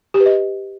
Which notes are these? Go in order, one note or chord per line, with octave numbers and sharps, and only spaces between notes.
G4
B4
D#5